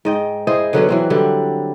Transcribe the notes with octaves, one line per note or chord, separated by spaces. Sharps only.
G#2 D#5 G5
E4 G#4 C5 D#5
D3 F#3 B3 C#4
E3 F#3 C4
D3 F#3 G3 E4